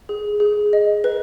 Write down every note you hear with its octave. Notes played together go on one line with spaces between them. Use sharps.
G#4
G#4
D#5
B4